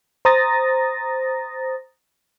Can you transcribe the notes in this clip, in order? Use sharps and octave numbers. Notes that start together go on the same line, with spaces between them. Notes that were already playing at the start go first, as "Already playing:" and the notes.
C5 A#5 D#6 A6 A#6